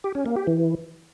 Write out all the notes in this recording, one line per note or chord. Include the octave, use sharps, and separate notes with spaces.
G4
C#4
A#3
G4
E3